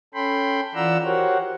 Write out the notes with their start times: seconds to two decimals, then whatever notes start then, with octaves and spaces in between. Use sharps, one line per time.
0.14 C#4 A4 G5 B5 C6
0.75 E3 F4 D5 F#5 A#5 E6
1.04 F#4 G4 A#4 C5 C#5 F#5